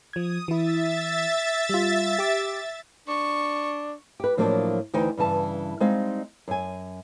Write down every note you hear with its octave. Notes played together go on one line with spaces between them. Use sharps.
F3 D#6 G#6
E3 E4 E5 A6
G3 F4
G4 D6
D4 C#6
G4 B4
A2 F3 F#3 A#3 D4
D2 E3 D#4 C5 G5
G2 C#3 E3 A5
G3 G#3 C4 D#4 F5
F#2 G#5